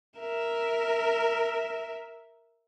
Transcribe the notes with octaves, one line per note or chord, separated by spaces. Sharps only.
A#4 E5